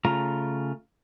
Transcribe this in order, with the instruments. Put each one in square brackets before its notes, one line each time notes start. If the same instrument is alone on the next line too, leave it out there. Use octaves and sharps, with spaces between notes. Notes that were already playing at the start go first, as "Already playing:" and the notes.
[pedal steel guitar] C#3 A3 F4 A#5